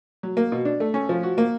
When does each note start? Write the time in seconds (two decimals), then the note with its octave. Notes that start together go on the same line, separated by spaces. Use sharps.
0.23 F#3
0.37 A#3
0.52 B2
0.65 D4
0.80 A3
0.94 C#4
1.09 F3
1.23 F#4
1.38 A#3